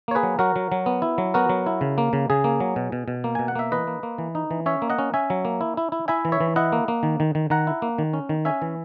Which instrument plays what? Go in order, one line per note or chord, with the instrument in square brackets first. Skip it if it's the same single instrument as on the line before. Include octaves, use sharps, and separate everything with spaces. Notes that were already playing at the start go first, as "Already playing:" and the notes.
[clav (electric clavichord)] A#3 C#5
G#4 B4
F#3
F#3 F#4 A#4
F#3
F#3
B3
E4
F#3
B3 F#4 A#4
F#3
E4
C#3
A#3
C#3
C#3 G#4
A#3
F#3
B2
B2
B2
A#3
B2 G#5
F#5
A#3 E5
E3 B4 D#5
A#3
A#3
E3
D#4
E3
C#4 C#5 E5
A#3
D#5 F#5
C#4
C#4 E5 G#5
F#3
A#3
E4
E4
E4
E4 E5 G#5
E3
C#5 E5
E3
E4 D#5 F#5
A#3
A#3
D#3
D#3
D#3
D#3 F#5 A#5
E4
A#3
D#3
C#4
D#3
C#4 E5 G#5
E3